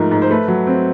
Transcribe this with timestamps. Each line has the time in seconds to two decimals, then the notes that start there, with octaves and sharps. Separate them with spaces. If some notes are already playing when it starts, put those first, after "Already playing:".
Already playing: G#2 F3 A3 A#4
0.11 G#2
0.22 C5
0.31 A3 B4
0.48 F#3
0.67 C4